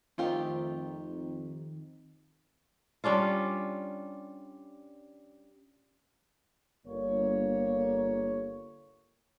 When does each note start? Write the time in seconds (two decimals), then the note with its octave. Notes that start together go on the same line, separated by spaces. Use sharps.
0.18 F2 D#3 A3 C4 D#4 F4 G4
3.04 G3 C#4 D4 F4
6.86 G1 A#3 C#5